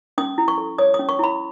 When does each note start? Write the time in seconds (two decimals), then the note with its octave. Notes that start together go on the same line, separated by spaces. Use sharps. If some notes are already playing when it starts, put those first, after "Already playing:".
0.18 C#4 D#6
0.38 E4
0.48 C#6
0.58 A4
0.78 C#5 D#6
0.94 C#4 D#6
1.09 C#6
1.19 E4 B5